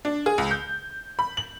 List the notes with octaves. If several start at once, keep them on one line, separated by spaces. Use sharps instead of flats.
D4
G#4
C#2
G6
B5
F#7